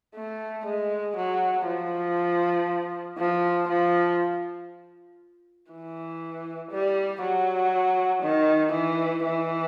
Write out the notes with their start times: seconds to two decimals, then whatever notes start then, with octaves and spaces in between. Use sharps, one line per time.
0.15 A3
0.65 G#3
1.16 F#3
1.66 F3
3.18 F3
3.68 F3
5.70 E3
6.71 G3
7.21 F#3
8.23 D#3
8.72 E3
9.24 E3